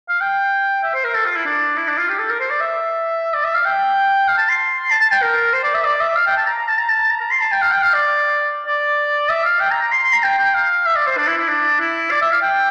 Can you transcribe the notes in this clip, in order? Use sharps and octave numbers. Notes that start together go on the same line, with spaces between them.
F5
G5
E5
C5
A#4
A4
F4
E4
D4
E4
D4
F4
G4
A4
A#4
C5
D5
E5
D5
E5
F5
G5
F5
A5
C6
A5
A5
G5
A#4
C5
D5
E5
D5
E5
F5
G5
A5
A#5
A#5
A5
A#5
A5
A#5
A#5
C6
A5
G5
F5
G5
F5
D5
D5
E5
F5
G5
A#5
A#5
C6
C6
A#5
G5
G5
F5
E5
D5
C5
D4
E4
E4
D4
E4
D5
E5
F5
G5